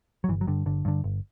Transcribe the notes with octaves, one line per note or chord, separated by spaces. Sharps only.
F#3
G1 E3
F#3
G2 D3
G1 D3
G2 D3
G1